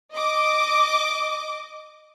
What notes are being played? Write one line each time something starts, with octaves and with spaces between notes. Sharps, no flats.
D#5 D6